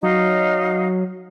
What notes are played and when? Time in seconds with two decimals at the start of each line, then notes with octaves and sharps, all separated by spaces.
0.03 F#3 D#4 D#5 F5